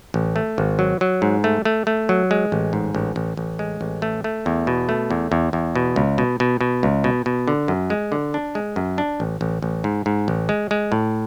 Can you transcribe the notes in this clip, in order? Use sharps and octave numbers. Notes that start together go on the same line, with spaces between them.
A1
A3
G#1
F#3
F#3
G#2
A3
A3
A3
F#3
G#3
A1
G#2
A1
A1
A1
G#3
A1
A3
A3
E2
B2
A3
E2
E2
E2
B2
C#2
B2
B2
B2
C#2
B2
B2
D3
F#2
G#3
D3
D4
G#3
F#2
D4
A1
A1
A1
G#2
G#2
A1
G#3
G#3
A2